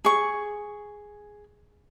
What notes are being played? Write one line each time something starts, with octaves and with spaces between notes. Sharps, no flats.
G#4 C#6